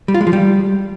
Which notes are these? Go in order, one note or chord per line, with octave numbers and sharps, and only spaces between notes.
G3
F4
G#3
F3
G3